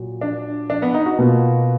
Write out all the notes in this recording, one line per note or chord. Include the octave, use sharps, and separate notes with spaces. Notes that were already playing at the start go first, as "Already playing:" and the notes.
Already playing: A#2 F#3
D4
D4
B3
D#4
F#4
B2 A#3 F4